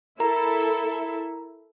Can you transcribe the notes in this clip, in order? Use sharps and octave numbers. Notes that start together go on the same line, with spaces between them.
E4 A4 A#4 E5 A#5